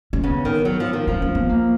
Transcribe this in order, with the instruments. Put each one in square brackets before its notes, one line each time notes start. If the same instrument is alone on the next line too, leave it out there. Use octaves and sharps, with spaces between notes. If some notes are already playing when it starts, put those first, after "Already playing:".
[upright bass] C#4
[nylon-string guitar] C#3 [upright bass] B3
[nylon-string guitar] D#3
F#3
F3
D#3
[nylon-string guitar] F3 [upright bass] C#4
[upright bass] C#4
B3
A#3